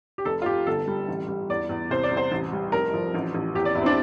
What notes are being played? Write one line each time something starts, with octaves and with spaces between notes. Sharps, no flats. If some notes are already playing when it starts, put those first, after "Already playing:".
G4
F1 A4
F4
F1 G4
G1 A4
G3
A1
G3
E2 D5
E2
C2 C5
D5
C2
C5
A1
G3
F1 A#4
F3
A1
A1
E2 G4
D5
E2 E4
C4
D4